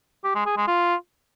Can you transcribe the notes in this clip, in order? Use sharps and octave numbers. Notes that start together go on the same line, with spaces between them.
G4
G#3
G#4
G#3
F4